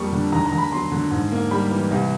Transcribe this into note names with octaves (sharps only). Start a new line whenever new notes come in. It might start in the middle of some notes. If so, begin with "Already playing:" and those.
Already playing: F2 G3 A#3 C#6 D#6
D3
D#2 A#5
A#5
D#2
B5
F#3 C6
D3
G#2
A#3
G3 B5
E3
C2